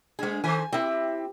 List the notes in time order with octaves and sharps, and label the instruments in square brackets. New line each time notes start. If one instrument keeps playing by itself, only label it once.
[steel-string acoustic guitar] G#3 G#4 [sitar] A3 D4
[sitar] D#3 A4 C5 [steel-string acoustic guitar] G#5
[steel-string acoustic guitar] C4 E4 [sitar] G4